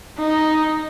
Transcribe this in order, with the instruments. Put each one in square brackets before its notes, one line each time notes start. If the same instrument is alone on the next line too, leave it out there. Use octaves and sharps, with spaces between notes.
[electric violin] D#4